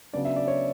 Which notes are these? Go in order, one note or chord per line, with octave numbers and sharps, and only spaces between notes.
C#3 F#3 B3 D4 D5
E5
D5
C#5